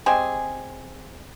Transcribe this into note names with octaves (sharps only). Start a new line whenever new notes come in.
G#3 C4 G4 G#4